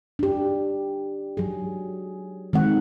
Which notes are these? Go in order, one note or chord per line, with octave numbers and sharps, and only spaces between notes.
D4 G4
F#3 G#4
D#3 G#3 C4 F#5